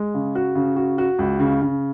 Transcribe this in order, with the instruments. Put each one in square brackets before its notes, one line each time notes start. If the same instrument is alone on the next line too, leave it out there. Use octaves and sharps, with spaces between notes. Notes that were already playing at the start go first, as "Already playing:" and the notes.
Already playing: [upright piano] G#3
C#3
F#4
C#3
F#4
F#4
C#2
C#3
C#3